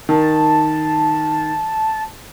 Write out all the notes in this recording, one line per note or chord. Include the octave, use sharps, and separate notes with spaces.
D#3 A5